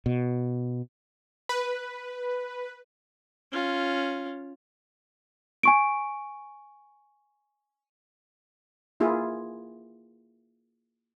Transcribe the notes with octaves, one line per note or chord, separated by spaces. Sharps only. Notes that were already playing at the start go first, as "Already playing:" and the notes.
B2
B4
C#4 F4
G#5 C#6 D7
A#3 E4 F4 G#4